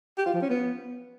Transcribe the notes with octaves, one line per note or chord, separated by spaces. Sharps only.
G4
F4
F3
C#4
B3